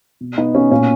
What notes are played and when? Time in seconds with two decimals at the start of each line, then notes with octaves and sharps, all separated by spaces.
0.21 B2
0.37 B2 B3 D#4
0.54 B2 C#4
0.71 A#2 C#4